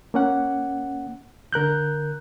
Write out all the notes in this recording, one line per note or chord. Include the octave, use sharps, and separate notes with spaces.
A#3 C#4 F#5
D3 A#4 F#6 G6